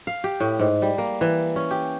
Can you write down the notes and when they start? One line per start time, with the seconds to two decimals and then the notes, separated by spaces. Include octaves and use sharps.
0.07 F5
0.24 G4
0.40 A2
0.59 G#2
0.82 G3
0.98 A#3
1.21 E3
1.56 C#4
1.71 G4